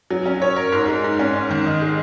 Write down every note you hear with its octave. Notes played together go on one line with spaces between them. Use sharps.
F#3
C#4
C#5
A#4
G#2
G#3
G#2
C#4
G#2
D#3
D#4
G#3